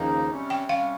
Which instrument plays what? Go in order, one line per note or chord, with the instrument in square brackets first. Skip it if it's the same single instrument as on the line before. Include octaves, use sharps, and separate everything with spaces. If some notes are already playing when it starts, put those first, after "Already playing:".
Already playing: [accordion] D#2 C#3 F3 A#3 D#4
C3 G3 C#4
[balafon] G5
[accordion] C3 G3 C#4 [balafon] F5